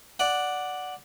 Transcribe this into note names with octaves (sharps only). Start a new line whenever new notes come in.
D5 F#5